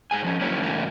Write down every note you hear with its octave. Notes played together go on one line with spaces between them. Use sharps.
G#2 G#4 G#5
F3 C#4
D3 F#3 A#3 C#4 E4 C#5
G2 C#3 E3 A3 A#3